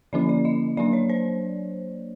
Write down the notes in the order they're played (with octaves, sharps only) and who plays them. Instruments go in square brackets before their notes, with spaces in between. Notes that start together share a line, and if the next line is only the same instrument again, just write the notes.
[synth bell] D3 F3 A#3 C#4 E4 D5
D5
D#5
F#3 A#3 D4 D5
C#5
C5